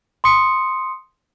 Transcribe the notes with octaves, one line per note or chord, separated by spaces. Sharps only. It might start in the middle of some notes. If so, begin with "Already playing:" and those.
C6 D#6 C#7